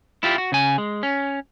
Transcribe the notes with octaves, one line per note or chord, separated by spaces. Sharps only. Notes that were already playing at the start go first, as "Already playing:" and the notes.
E4 F4 G4
F#4
C#3 G#5
G#3
C#4